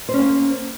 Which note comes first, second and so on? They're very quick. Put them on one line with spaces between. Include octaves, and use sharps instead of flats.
C5 C#4 A#3